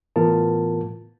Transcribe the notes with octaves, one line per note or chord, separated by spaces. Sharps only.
A2 E3 B3 F4 A#4 A5